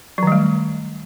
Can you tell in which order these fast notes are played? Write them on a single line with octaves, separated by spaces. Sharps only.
F#3 D#3 G3 A3